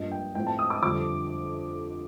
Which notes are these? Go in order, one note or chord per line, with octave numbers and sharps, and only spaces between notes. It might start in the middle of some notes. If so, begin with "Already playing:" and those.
Already playing: G2 F3 A#3 D4 D#5
G5
A2 F3 C4 G5
A5
D#6
D6
F2 D3 G3 D4 D6